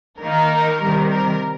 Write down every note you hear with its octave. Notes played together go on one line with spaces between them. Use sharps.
D#3 A#3 D#4 A#4
C3 D#3 G3
A#4